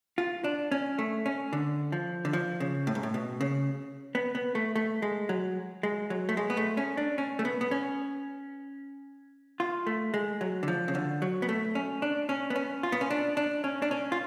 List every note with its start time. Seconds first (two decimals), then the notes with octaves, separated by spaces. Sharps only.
0.18 F4
0.44 D4
0.72 C#4
0.99 A3
1.26 C#4
1.53 D3
1.92 F3
2.25 D3
2.33 F3
2.60 C#3
2.87 A2
2.95 G#2
3.03 A2
3.14 B2
3.41 C#3
4.15 B3
4.35 B3
4.55 A3
4.76 A3
5.02 G#3
5.29 F#3
5.83 G#3
6.10 F#3
6.29 A3
6.37 G#3
6.50 B3
6.57 A3
6.77 C#4
6.97 D4
7.18 C#4
7.39 A3
7.45 B3
7.61 B3
7.71 C#4
9.60 F4
9.87 A3
10.14 G#3
10.41 F#3
10.63 D3
10.68 F3
10.88 C#3
10.95 D3
11.22 F#3
11.42 B3
11.49 A3
11.75 C#4
12.02 D4
12.29 C#4
12.50 B3
12.56 C#4
12.83 F4
12.92 B3
13.01 C#4
13.10 D4
13.37 D4
13.64 C#4
13.82 D4
13.91 C#4
14.12 F4